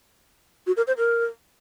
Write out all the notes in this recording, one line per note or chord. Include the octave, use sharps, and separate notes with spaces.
F#4
A#4
C5
A#4